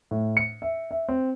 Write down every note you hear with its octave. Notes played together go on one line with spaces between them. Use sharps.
A2
C#7
E5
E5
C4